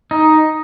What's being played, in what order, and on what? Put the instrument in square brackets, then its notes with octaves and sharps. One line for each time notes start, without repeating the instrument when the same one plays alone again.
[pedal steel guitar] D#4